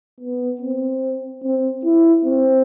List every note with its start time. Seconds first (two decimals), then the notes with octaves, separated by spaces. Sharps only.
0.20 B3
0.61 C4
1.43 C4
1.84 E4
2.25 C4